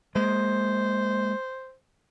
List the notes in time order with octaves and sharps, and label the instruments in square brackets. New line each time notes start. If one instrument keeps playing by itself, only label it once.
[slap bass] G#3 A#3 [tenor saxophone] C5